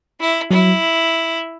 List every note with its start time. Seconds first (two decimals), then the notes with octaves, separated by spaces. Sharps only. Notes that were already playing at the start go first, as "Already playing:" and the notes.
0.20 E4
0.51 F#3 E4